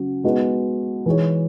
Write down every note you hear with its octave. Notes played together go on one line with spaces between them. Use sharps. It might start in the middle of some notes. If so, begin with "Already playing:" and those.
Already playing: C#3 F#3 C#4 F#4
G#3 B3 D#4 F#4
E3 G#3 D#4 G#4 C#5